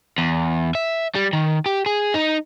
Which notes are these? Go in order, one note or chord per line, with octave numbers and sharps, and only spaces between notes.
E2
E5
G3
D#3
G4
G#4
D#4